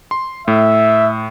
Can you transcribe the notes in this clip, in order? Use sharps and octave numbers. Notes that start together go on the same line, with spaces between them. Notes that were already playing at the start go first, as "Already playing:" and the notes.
C6
A2 E5